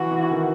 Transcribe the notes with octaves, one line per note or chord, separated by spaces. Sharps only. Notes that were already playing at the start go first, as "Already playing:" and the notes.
Already playing: E3 F#4
E3
D#3